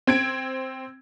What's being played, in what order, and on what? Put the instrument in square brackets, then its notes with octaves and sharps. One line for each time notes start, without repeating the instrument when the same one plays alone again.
[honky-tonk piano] C4 G#6 D7